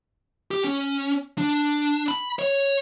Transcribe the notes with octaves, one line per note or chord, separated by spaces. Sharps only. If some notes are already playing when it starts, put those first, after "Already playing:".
G4
C#4
D4
B5
C#5